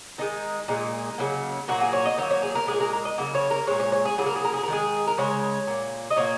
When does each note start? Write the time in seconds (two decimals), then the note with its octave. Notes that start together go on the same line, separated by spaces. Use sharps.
0.18 D#3 G#3 D#4
0.68 A#2 G#3 D#4
1.18 C#3 F#3 A#3
1.68 A#2 F#3 A#3 F#4
1.81 G#4
1.93 C#5
2.05 D#5
2.17 D#3 F#3 A#3 C#5
2.31 C#5
2.43 G#4
2.55 A#4
2.67 A#2 G#3 G#4
2.80 A#4
2.93 A#4
3.05 D#5
3.18 C#3 F#3 A#3
3.35 C#5
3.51 A#4
3.67 A#2 G#3 C#5
3.80 C#5
3.92 C#5
4.05 G#4
4.17 C#3 F#3 A#3 G#4
4.26 A#4
4.36 G#4
4.45 A#4
4.54 G#4
4.63 A#4
4.68 D#3 G#3 G#4
5.07 A#4
5.17 C#3 G#3 C#5
5.67 A#2 A#3
6.10 D#5
6.16 A#2 A#3 C#5